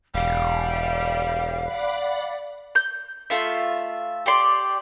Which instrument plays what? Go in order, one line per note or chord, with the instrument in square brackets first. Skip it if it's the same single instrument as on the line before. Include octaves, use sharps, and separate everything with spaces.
[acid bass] E1 [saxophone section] G3 [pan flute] F5
[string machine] D5 F#5 B5
[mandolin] G6
A3 F4 E5
G4 D5 C6